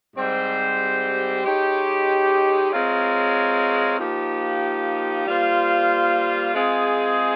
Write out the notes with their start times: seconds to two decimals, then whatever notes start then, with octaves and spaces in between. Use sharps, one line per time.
0.15 G#2 G3 C4 G4 C5
1.43 G#3 D#4 G4 C#5
2.70 G#3 C4 F4 A#4 C#5
3.99 F3 A#3 D#4 G4
5.26 G3 A#3 F4 C5 F5
6.54 G#3 C4 F4 G#4